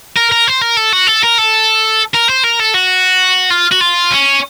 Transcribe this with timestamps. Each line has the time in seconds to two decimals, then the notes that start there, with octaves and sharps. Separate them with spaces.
0.17 A#4
0.32 A#4
0.48 C5
0.62 A#4
0.77 A4
0.93 F#4
1.07 A4
1.24 A#4
1.38 A4
2.14 A#4
2.29 C5
2.44 A#4
2.60 A4
2.74 F#4
3.51 F4
3.72 F#4
3.81 F4
4.11 C#4